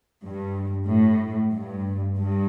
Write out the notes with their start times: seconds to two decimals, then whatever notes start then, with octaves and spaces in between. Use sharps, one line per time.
0.25 G2
0.89 A2
1.54 G2
2.18 G2